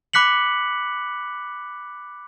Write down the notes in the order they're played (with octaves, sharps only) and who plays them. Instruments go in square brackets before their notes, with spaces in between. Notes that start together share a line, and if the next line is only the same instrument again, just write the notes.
[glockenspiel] B5 D6 F#6 B6 C#7 F#7